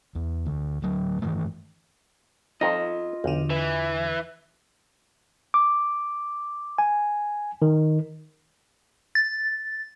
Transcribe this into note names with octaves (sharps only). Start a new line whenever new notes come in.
E2
D2
D2 F#3
G2 D#3 E3 A3
F2 D#4 F4 D#5
B1 E2 D3
E3 B4
D6
G#5
D#3
A6